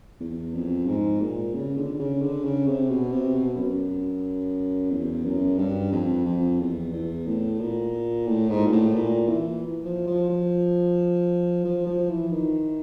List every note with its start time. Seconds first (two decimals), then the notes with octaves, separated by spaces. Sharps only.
0.20 E2
0.54 F2
0.88 G#2
1.21 A#2
1.55 C#3
1.77 D3
1.94 D3
1.99 C#3
2.22 D3
2.44 C#3
2.67 C3
2.89 B2
3.11 C3
3.34 B2
3.57 F#2
4.91 E2
5.25 F#2
5.58 G2
5.92 F2
6.26 F2
6.60 E2
6.93 E2
7.27 A2
7.60 A#2
8.28 A2
8.50 G#2
8.67 A#2
8.72 A2
8.95 A#2
9.28 E3
9.84 F3
10.07 F3
10.29 F3
11.64 F3
11.86 F3
12.09 E3
12.31 D#3